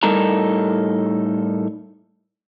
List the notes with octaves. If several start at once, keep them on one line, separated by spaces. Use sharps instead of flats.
A2 G3 D#4 A4 A#4 A#5